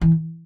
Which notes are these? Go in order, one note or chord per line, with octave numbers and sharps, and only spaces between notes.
E3